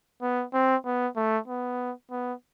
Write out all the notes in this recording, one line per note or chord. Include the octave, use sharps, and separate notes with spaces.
B3
C4
B3
A3
B3
B3